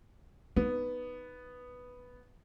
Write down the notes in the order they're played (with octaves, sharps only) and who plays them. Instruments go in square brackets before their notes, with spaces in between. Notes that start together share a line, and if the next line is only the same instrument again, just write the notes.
[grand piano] B3 [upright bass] D#4